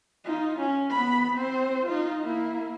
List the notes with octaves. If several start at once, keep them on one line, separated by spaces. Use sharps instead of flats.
D#4 F4
C#4
B3 B5
C4 C5
D#4 F4
A#3 E4